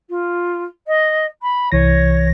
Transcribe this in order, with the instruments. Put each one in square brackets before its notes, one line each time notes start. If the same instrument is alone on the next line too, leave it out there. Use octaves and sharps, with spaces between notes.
[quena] F4
D#5
B5
[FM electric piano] C2 E3 A#6 [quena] C#5